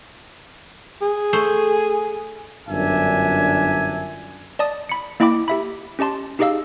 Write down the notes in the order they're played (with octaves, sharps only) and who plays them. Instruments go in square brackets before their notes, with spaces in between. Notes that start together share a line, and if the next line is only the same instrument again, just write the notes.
[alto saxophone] G#4
[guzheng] A3 C5
[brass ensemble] G1 F#2 D4 E5 G#5
[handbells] D5 D#5 A5 D#6
B5 C#7
A#3 E4 D#5 G5 B5 D6
G4 E5 B5
C#4 G4 D#5 A5 C6
D#4 G4 G#4 D#5 F5 E6